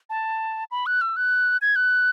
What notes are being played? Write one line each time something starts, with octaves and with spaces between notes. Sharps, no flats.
A5
B5
F#6
E6
F#6
G#6
F#6